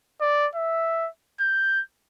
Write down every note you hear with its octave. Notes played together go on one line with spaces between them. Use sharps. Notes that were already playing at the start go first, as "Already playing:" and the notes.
D5
E5
G6